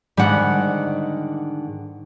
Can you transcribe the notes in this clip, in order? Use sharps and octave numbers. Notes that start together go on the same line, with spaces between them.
G#2 D3 D#3 G3 F#5